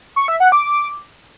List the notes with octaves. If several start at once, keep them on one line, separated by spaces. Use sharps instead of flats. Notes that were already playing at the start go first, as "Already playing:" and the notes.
C#6
E5
F#5
D6